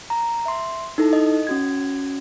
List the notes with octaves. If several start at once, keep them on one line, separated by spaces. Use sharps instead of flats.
A#5
E5 C6
D#4 E4 A4
D#5
C#4 F#4 G#6